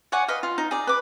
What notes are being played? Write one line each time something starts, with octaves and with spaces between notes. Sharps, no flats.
C#5 D5 F#5 G#5
B4 D#5 F5
F4
D#4
G#4 D5
B4 D6